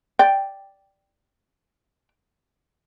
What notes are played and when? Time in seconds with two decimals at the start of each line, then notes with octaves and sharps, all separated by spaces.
0.19 D5 G5